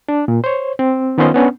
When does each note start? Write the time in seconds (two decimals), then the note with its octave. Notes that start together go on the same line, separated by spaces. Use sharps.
0.09 D4
0.28 A#2
0.44 C5 C#5
0.79 C4
1.18 D#3 B3 C#4 F4 C5 D#5
1.34 B3 C#4 D4